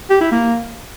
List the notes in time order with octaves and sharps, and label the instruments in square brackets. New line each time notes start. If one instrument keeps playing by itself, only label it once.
[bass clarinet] G4
E4
A#3